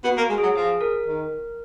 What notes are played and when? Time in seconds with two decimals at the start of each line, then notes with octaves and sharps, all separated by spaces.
0.04 B3 F#4
0.17 A#3
0.29 G#3
0.38 F#3 G#4
0.56 F3 G#4
0.81 A#4
1.06 D#3